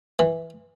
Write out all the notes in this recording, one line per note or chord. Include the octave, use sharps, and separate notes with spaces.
E3